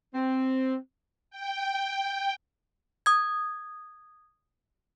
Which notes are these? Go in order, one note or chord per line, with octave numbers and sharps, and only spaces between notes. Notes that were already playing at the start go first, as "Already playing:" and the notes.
C4
G5
D#6 G#6